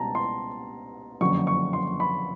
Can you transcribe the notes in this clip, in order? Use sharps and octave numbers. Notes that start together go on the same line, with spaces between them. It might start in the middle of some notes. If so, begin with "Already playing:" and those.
Already playing: C#2 B2 G3 A5 A#5
C6
F#1 F2 D3 F#3 C#6
C#6
C6
B5